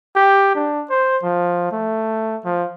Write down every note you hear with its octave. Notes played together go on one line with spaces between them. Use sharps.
G4
D4
C5
F3
A3
F3